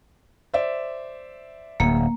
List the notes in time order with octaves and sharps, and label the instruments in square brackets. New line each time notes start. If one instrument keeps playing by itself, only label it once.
[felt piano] C5 D5 E5
[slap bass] D1 [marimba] A#3